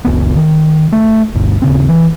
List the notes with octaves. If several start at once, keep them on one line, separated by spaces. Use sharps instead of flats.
F#1 C#2 B3
D#3
A3
G1 D2 G2
D#1 C#3 C4
E3